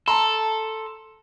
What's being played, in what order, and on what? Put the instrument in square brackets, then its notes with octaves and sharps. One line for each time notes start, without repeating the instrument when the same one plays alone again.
[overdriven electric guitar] A4 [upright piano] A5 A#5 C6